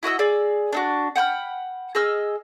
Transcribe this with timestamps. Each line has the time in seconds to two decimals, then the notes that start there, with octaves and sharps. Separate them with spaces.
0.03 E4 F#4 D#5 E6
0.19 G#4 D5 E6
0.73 D4 D#4 F#4
1.16 F#5 G5 B5 F6
1.95 G#4 D#5 E6 F6